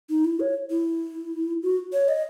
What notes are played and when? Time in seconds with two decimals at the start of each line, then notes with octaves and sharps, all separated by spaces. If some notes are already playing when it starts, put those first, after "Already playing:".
0.10 D#4
0.25 E4
0.40 C#5
0.70 E4
1.62 F#4
1.93 C#5
2.08 D#5